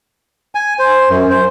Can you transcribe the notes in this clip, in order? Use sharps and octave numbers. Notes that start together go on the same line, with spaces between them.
G#5
C5
F#2
C5